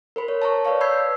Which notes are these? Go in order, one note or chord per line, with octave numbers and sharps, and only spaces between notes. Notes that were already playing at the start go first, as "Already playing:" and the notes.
A#4 C5 B5
C#5
A5 A#5 C#6
B4 C#5 D5 F5 C#6
B5 E6 G6 G#6 C7